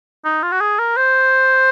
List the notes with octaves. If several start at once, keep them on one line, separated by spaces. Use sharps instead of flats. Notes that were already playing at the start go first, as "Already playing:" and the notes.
D#4
F4
F#4
G#4
A#4
C5